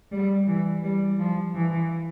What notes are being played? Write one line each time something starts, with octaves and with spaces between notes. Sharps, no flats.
G3
E3
G3
F3
E3